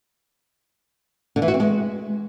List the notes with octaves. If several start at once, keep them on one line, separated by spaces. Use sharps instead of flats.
D3
E3
F#4
C4
G#3